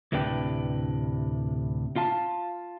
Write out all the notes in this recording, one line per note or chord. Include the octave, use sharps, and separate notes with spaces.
D2 A2 C3 D4 B4 G5
F4 F5 A5